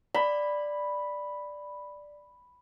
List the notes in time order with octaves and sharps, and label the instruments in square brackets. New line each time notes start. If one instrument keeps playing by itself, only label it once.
[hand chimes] D5 [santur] B5